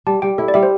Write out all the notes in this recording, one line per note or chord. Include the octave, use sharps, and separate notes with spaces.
G3 A5
G3 G5
E4 A4
D5
G3 E5
C5